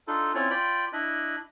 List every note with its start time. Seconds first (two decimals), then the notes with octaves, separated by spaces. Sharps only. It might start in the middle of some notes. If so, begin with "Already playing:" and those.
0.08 D4 D#4 F4 A4
0.35 C4 C#4 E4 F4 C#5 D5
0.50 F4 D5 G5 B5
0.93 D4 E4 D#5 B5 F#6